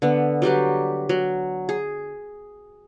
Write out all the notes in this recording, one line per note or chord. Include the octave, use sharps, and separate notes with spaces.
D3 B3
F#3 G3 G4 B4
F#3
G#4